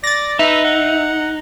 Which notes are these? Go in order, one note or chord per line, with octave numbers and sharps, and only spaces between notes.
D5 A6 A#6
D#4 B4 E5
F#5